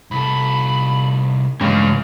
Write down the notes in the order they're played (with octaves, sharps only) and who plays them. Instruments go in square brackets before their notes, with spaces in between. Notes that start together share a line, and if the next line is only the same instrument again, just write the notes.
[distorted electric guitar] C2 A4 [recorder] B5
[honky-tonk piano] A1 [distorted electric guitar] G2 [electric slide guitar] C#3 G#3 C#4 [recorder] F5